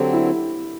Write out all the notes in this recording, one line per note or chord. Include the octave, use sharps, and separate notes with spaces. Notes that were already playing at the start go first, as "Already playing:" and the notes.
Already playing: D3 F#3 C4 G4
E4